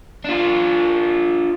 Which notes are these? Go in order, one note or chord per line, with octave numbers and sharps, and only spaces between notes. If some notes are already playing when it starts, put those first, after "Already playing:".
D4 F4